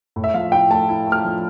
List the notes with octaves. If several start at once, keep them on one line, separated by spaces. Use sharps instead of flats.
A2
E5
F3 F5
E4 G5
A3 A5
E4
A3
F6
F3